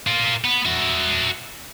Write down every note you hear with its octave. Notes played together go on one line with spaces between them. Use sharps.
F4 A#4
B3
F#4 E5